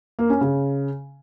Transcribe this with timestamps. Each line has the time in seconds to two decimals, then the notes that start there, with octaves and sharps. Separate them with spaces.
0.19 A#3
0.30 C#4
0.41 C#3